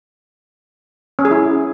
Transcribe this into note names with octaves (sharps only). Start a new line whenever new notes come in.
C#4
G#4
E4